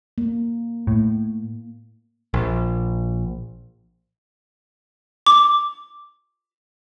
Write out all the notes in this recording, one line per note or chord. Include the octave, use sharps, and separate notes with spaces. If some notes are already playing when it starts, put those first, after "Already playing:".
A#3
A2
A#1
D6